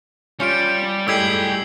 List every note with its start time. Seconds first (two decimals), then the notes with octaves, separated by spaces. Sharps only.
0.40 G3 C#4 F4 F5 C#7 D7
1.08 A2 G3 G#3 G4 G#5 E6 G#6 C7